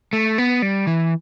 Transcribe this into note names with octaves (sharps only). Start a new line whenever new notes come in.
A3
B3
G3
E3